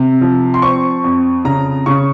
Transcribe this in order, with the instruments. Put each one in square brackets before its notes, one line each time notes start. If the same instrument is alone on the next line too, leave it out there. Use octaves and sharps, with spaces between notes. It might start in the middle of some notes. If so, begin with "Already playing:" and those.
Already playing: [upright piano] C3
F3
C6
C4 C#6
F2
C#3 A#5
C#3 C#6